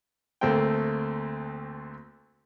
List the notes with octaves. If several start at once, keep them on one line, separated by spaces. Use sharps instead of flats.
D2 A3 A#3 C4 G5